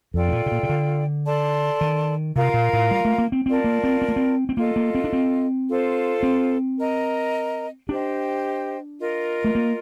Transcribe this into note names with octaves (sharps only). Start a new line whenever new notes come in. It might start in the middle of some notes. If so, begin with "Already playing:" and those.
F2 F4 A4 D5 G5
A2
A#2
C3
A#2
C3
D3
A4 D5 A5 C6
D#3
C3 F4 A#4 F5 A#5
A#2
A2
G3
A3
A#3
C4
C4 F4 A#4 D5 A5
A#3
C4
C4
A#3
C4
C4
A#3 F4 A4 D#5
A#3
C4
D4
C4
F4 A4 C5
C4
A#4 D#5 A#5
D4 G4 C5 D#5 G5
F4 A#4 D#5
A3
A#3